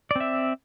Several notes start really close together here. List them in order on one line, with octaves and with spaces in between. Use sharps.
D5 C4 E5